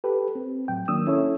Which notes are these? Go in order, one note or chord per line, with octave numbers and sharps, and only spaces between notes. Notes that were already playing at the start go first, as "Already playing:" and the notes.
G4 A4 B4
C4
A2 F#3 G5
D#3 F#3 A#3 D4 D#6 E6
C#4 E4 A4 C#5